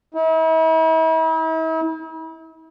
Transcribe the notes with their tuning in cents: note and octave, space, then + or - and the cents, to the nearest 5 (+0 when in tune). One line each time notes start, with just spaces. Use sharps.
E4 -45